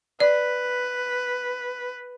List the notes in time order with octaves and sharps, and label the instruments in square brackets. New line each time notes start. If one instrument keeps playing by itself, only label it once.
[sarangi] B4 [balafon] D5